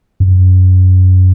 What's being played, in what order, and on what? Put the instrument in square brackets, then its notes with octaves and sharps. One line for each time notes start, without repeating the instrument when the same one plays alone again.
[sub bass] F#2